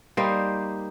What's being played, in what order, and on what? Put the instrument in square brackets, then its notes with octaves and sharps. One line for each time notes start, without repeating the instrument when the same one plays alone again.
[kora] G3 A#3 D#4 C5